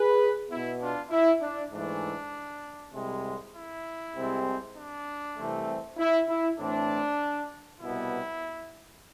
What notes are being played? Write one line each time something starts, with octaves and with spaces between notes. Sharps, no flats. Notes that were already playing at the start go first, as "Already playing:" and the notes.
Already playing: G#4 B4
B2 B3 E4
D4 F4
E4
D4
G#2 E3 A3 D4
C2 C3 G#3
E4
C2 C3 G#3 C4
D4
C2 C3 E3 A3 C4
E4
E4
A2 E3 A3 C4 D4
C2 B2 B3 E4